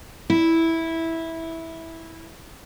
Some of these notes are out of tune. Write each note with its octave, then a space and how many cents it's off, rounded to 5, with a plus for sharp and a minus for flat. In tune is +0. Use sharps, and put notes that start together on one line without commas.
E4 -10